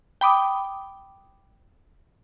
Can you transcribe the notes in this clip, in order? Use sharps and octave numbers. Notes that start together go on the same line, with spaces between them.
G5 B5 D6 D#6